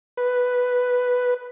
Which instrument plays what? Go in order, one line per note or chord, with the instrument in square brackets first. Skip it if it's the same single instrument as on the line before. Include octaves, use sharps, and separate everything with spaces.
[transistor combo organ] B4